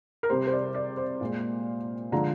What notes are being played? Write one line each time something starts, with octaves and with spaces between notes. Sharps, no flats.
A#4
C3 G3 C5
C5
D5
D5
C5
A#2 G#3
D3 F3 G#3 A#5